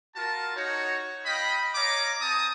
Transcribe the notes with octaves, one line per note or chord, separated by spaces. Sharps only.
F4 F#4 A#4 A5
D#4 F#4 C#5
D#5 F5 G5 B5
C#5 D#5 F5 A#5 D6
C4 A5 A#5 D#6